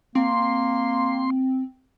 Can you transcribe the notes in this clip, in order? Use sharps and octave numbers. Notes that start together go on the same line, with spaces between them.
A#3 C4 C6